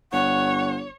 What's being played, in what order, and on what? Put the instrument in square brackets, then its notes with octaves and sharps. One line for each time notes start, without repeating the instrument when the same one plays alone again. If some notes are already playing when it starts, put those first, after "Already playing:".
[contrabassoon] G1 [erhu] C#5 [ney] F#5 [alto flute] C#6